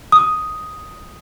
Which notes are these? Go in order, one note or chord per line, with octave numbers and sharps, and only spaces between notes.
D#6